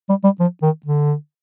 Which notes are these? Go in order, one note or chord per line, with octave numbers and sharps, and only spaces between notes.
G3
G3
F3
D#3
D3